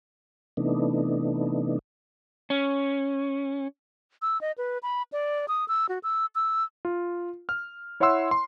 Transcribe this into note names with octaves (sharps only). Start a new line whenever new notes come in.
C3 E3 A3 B3 D4 D#4
C#4
E6
D#5
B4
B5
D5
D#6
E6
F#4
E6
E6
F4
F6
E4 C#5 E5 F#5 C6 E6
C6